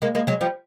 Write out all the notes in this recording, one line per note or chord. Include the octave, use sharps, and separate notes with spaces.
G#3 A#3
G#3 A#3
F#3 G#3
F3 G3